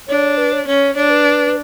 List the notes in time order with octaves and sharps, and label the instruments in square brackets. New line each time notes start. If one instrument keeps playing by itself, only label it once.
[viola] D4 [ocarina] C#5
[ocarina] B4
C#5
[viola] C#4 [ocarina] C#5
[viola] D4 [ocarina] C#5
[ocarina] B4